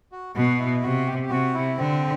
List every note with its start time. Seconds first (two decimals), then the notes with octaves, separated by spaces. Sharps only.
0.12 F#4
0.36 B2 F#4
0.59 E4
0.83 C3 F#4
1.07 G4
1.23 G4
1.30 C3 F#4
1.54 E4
1.78 D3 C4